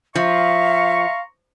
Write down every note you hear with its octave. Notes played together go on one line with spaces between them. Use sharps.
F3 E5 F5 A#5 C6 C#6